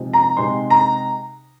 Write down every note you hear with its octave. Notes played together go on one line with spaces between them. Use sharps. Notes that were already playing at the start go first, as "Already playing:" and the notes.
Already playing: C3 F3 G#3 C4 D#4
A#5
C3 G#3 D#4 C6
A#5